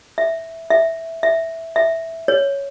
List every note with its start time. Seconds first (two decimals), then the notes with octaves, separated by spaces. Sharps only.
0.18 E5
0.70 E5
1.23 E5
1.76 E5
2.28 C#5